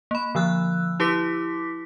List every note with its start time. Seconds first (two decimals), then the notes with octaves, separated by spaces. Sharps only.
0.11 A#3 B5
0.35 D3 F3 E6 F#6
1.00 E4 G4 B4 D6 B6